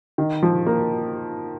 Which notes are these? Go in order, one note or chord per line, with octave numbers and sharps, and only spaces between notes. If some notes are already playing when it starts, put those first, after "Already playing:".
D#3
F3
A#3